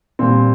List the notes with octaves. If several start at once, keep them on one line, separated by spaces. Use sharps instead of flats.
A#2 G3 C4